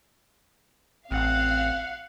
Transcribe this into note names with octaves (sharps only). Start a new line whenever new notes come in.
A1 C4 F5 F#5